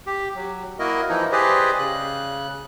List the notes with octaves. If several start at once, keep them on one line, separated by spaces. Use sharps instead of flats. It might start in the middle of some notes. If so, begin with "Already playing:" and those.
G4
F#3
A#3 E4 F#4 A#4 D#5
E3 F3 D#4 E4
G4 G#4 B4 C5 D5 D#5
C#3 F#6